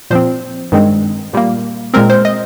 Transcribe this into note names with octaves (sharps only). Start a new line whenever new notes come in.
A#2 F3 C4 C5
G2 D#3 G#3 C4
A#2 G3 A#3
A#2 G#3 C4 A#4
C5
D#5